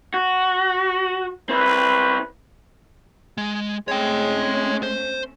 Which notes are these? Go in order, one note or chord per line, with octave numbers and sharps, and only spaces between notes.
F#4
C4 E4 B4
G#3
G#3 A3 C4 C#4 C#5 G5
C5